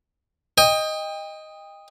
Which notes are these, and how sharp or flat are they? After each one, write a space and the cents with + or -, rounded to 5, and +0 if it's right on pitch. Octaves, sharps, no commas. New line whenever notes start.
D#5 +0 G5 +30